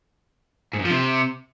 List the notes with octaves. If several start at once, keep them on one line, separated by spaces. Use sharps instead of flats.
G#2
F#2
F3
C3